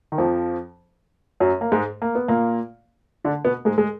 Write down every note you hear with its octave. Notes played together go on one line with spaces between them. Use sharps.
D#3
F2 F3
F#2 F#3
A#3
G#2 G#3
A#3
B3
A#2 A#3
D3 D4
B2 B3
G#2 G#3
G#3